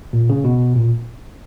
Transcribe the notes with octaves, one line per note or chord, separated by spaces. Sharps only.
A#2
C#3
B2
A#2